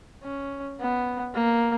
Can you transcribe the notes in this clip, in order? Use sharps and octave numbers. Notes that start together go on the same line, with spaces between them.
C#4
B3
A#3